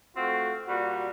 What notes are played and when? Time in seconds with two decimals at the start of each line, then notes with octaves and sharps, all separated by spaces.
0.17 A3 C4 F4 F#4
0.67 A#2 G3 F#4